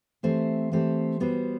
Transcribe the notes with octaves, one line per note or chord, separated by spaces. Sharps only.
E3 A3 C4 G4 C5
E3 A3 C4 G4 C5
G3 B3 F#4 C5